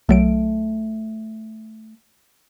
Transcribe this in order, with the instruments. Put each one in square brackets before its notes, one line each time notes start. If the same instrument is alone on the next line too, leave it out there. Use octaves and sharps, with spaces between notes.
[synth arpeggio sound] B1 F#3 D7 [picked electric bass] A3